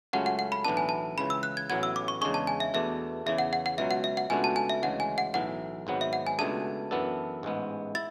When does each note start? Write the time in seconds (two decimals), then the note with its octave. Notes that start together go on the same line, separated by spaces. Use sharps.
0.13 C#2 C#3 F#3 A3 C#4 F#5
0.26 F#5
0.39 F#5
0.52 B5
0.65 B1 A2 E3 B3 D4 A5
0.77 G#5
0.89 A5
1.18 C#2 C#3 E3 B5
1.30 E6
1.43 F#6
1.57 G#6
1.70 A1 A2 F#3 B3 G#6
1.83 E6
1.96 D6
2.08 C#6
2.21 E2 C#3 G#3 D4 G#4 C#6
2.34 A5
2.47 G#5
2.60 E5
2.74 E2 B2 A3 D4 E5
3.26 E2 C#3 E3 E5
3.38 F#5
3.53 F#5
3.66 F#5
3.78 C#2 B2 F#3 E5
3.91 F#5
4.04 E5
4.17 F#5
4.30 C#2 B2 A3 D4 F#4 G#5
4.44 A5
4.56 G#5
4.69 E5
4.83 D2 C#3 E3 G#3 F#5
5.00 G#5
5.18 F#5
5.34 B1 A2 E3 F#5
5.87 G#1 G#2 F#3 B3
6.01 E5
6.13 F#5
6.27 G#5
6.39 C#2 B2 A3 D4 G#4 A5
6.91 F#2 E3 B3 D4 A4
7.43 A1 G#2 G#3 B3
7.95 E4 A6